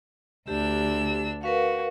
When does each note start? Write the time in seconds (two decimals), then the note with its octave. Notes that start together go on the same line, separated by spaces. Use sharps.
0.48 D2 D4 G4 E6
1.43 F#4 A#4 B4 F5